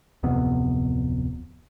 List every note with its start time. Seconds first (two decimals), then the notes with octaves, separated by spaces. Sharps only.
0.23 D1 F2 C3 B3